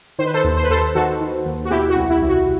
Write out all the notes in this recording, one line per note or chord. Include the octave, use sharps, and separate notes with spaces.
D#3 C5
B4
A4 C5
D#2
C5
B4
D#2 A4 C5
D#3 F#4 A4
D#3
D#2
F#4
B2 E4 G4
F#4
C2
E4
C2
F#4